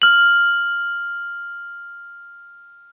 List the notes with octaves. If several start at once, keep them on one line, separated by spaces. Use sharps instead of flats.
F6 F#7